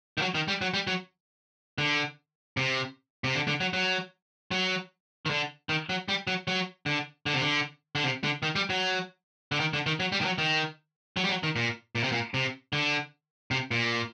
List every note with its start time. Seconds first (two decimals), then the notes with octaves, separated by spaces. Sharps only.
0.18 D#3
0.22 F#3
0.35 D#3
0.48 G3
0.61 F#3
0.74 G3
0.87 F#3
1.78 D3
2.57 C3
3.24 C3
3.35 D3
3.47 D3
3.61 F#3
3.73 F#3
4.51 F#3
5.26 D#3
5.30 D3
5.69 D#3
5.89 F#3
6.08 G3
6.27 F#3
6.48 F#3
6.86 D3
7.26 D3
7.34 C3
7.41 D3
7.95 D3
8.03 C3
8.24 D3
8.43 D#3
8.56 G3
8.70 F#3
9.52 D3
9.60 D#3
9.73 D3
9.86 D#3
10.00 F#3
10.12 G3
10.21 D#3
10.25 F#3
10.38 D#3
11.17 F#3
11.24 G3
11.29 F#3
11.43 D#3
11.56 A#2
11.95 A#2
12.04 C3
12.12 A#2
12.34 C3
12.73 D3
13.51 C3
13.71 A#2